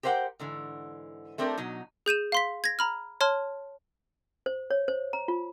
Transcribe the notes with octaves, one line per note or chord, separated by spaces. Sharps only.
G4 A#4 C5 E5 F#5 G5
G#2 D3 E3
A3 C4 D4 G4 A#4
B2 F#3 D#4
G#4 G6 D#7 E7
F5 C6 B6
G#6 A#6
A#5 B5 F6
C#5 A5 C6 F6
C5
C#5
C5
A#5
F4